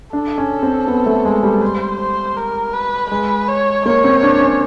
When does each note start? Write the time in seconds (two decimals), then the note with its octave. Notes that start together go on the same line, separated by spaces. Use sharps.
0.13 D4 A4
0.38 C#4
0.63 C4
0.88 B3
1.06 A3
1.25 G#3
1.43 G3
1.61 C5
2.00 C5
2.37 A#4
2.73 B4
3.10 G#3 B4
3.48 C#5
3.85 A#3 C#5
4.04 C4
4.23 D4
4.41 C#4